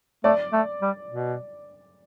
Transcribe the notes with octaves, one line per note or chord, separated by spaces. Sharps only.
A3 D5
A3
G3
B2